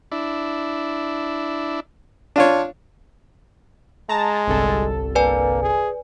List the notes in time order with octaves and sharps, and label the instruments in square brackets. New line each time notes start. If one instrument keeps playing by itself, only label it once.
[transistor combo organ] D4 E4
[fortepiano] D4 F4 C#5
[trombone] G#3 [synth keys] A5 A#5
[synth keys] G1 C2 A4
[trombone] A#3 [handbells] B4 D5 G#5
[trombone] G#4